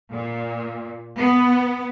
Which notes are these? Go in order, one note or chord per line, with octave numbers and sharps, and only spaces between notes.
A#2
B3